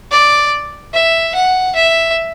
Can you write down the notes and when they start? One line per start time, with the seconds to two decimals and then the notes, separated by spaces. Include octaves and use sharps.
0.12 D5
0.94 E5
1.35 F#5
1.76 E5